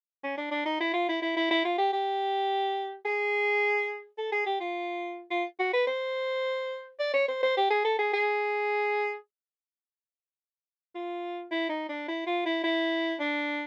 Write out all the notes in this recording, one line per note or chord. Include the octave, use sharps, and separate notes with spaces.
C#4
D4
D4
D#4
E4
F4
E4
E4
E4
E4
F4
G4
G4
G#4
A4
G#4
G4
F4
F4
F#4
B4
C5
D5
C#5
C5
C5
G4
G#4
A4
G#4
G#4
F4
E4
D#4
D4
E4
F4
E4
E4
D4